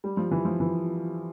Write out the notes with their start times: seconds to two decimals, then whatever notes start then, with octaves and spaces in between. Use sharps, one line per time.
0.04 G3
0.17 F3
0.31 E3
0.45 F3
0.60 E3